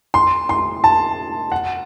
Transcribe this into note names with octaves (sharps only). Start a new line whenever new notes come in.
C6
C6
A5
F#5